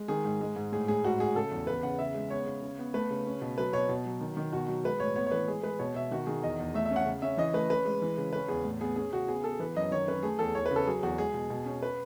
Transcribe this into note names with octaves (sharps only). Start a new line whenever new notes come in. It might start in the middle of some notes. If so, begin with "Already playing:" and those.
Already playing: G#3
D#3 G#4
G#2
G#3
G#2
A2 G#4
A2 G#4
G#2 F#4
G#2 G#4
C#3 A4
E2
E2 B4
C#3 F#5
C#3 E5
G#3
B3 C#5
C#3
C#3
B3
A3 B4
C#3
C#4
B2
F#3 B4
B2 C#5
B2
F#3
D#3
D#3
B2 F#4
F#3
G#3 B4
A2 C#5
B3 C#5
C#5
E3 B4
G#3 G#4
G#3 B4
B2 C#5
B2 E5
D#3 F#4
D#3 G#4
E2 D#5
E2
A3 E5
E5
C#4
F#5
C#3
C#4 E5
E3 D#5
A3 B4
C#4 B4
G#3
E3
C#3
C#4 B4
E2 G#4
A2
B3 G#4
C#4 G#4
C#3 F#4
B3 G#4
B3 A4
E3 B4
F#2 D#5
D#3 C#5
C#4 B4
A3 G#4
E2 A4
E2 C#5
B4
C#3
A4
F#3 G#4
E2 F#4
G#3 G#4
B2
B2
C#4
B4